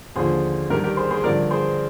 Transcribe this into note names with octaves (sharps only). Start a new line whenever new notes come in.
D#2 D3 F3 G#4 C5
G2 D#3 G4 A#4
G4 A#4
G#4 C5
G#4 C5
G2 D3 F3 A#4 D5
G#4 C5